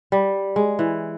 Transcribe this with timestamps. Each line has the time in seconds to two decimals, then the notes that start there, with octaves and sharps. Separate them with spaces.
0.12 G3
0.56 G#3
0.79 E3